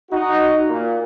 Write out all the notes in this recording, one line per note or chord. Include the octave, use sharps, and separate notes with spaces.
D#4 F#4
A#2